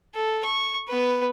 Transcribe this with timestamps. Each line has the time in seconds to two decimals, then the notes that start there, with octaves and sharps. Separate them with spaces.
0.14 A4
0.45 C#6
0.89 B3 B4